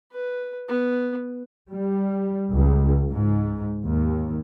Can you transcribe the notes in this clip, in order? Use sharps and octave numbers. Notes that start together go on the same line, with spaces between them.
B4
B3
G3
C#2
G#2
D#2